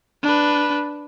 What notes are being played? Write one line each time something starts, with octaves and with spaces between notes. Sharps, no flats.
D4 B4